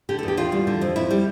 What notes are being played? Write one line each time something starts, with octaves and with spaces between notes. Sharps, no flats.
D3 G4
A4
E2
G4
E2 F4
G3
D3
F2
F2 E4
G3